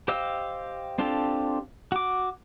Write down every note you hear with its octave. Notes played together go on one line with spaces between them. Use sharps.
G4 C5 D#5 F5 E6
C4 D4 F4 G4 A4
F#4 D6